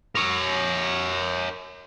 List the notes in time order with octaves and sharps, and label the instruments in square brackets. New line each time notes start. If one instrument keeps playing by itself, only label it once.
[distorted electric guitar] A#4 C#5